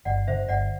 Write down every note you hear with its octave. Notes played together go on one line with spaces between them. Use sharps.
G1 D5 F#5
D3 C5 E5
G1 D5 F#5